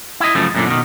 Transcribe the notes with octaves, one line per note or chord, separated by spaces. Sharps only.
E4 D#5
F#2 C#3 F3 A3
F#2 A#2 D3
B2 D#3